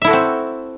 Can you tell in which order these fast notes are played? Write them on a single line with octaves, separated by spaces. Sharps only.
E5 E4 A4 F#4 C4